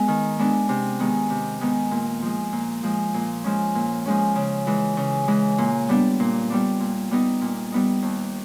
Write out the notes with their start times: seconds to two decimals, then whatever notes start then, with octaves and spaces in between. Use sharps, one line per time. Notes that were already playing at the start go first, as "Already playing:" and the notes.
Already playing: G#3 B3
0.08 D#3
0.39 G#3 B3 D4
0.69 C3
1.00 D#3 G#3 B3
1.30 C3
1.61 D#3 G#3 B3
1.91 A#2
2.22 F3 G#3
2.53 A#2
2.83 F3 G#3
3.14 A#2
3.44 F3 G#3 C#4
3.75 A#2
4.06 F3 G#3 C#4
4.36 C#3
4.67 E3 G#3
4.97 C#3
5.28 E3 G#3
5.58 A#2
5.89 G3 B3 D4
6.20 A#2
6.50 G3 B3 D4
6.80 A#2
7.11 G3 B3 D#4
7.42 A#2
7.72 G3 B3 D#4
8.02 D#2